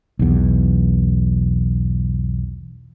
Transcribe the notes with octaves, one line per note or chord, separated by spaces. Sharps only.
B1 E2